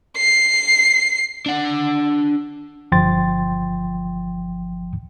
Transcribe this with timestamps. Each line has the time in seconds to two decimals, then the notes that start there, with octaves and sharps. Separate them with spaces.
0.17 C7
1.46 D4 F#5
2.92 G1 F3 G5 C6 A6